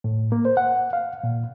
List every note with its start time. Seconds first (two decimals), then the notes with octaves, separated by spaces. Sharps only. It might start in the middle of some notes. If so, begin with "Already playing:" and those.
0.04 A2
0.32 A#3
0.45 C5
0.57 F#5
0.93 F5
1.24 A#2